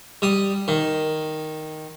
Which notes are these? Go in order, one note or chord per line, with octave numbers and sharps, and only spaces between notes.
G3 D#6
D#3